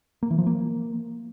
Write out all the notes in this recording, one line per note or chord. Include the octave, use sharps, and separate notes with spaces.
A#3
E3
F3
A#3